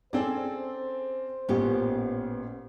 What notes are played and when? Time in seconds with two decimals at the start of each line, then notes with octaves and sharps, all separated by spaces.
0.13 C4 C#4 G#4 A4 C5 D5
1.49 A1 A#2 B3 C#4 G4